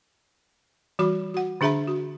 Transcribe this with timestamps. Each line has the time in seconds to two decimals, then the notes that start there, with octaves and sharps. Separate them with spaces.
0.99 E3 G3 F#4 B5 D6
1.34 F#4 F#5
1.61 D3 D4 G#4 E5 A#5 B5
1.87 F#4